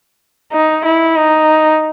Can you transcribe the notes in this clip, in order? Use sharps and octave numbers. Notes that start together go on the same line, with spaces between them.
D#4
E4
D#4